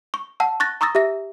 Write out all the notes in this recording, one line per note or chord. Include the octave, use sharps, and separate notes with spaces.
C#6
F#5 A5 E6
C#6 F#6 A6 A#6
A#5 C#6 D#6 E6 A6 A#6
G4 E5 A#6